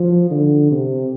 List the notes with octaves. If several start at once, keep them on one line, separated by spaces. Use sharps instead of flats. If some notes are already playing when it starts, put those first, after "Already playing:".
Already playing: F3
D3
C3